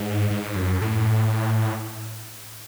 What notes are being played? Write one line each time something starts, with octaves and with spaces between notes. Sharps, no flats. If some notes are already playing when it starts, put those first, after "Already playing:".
Already playing: G#2
G#2
F#2
A2